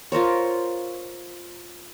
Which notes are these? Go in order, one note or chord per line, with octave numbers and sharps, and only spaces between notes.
F4 A#4 C5 C#5